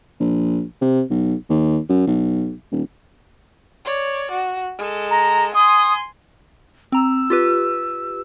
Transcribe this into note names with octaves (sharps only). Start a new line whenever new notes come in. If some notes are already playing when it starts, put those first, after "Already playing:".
A#1
C3
B1
D#2
F#2
B1
D#1
C#5 D5
F#4
G#3 A4
A#5
G#5 C6 D#6
C4 A#5 E6
F4 G4 B4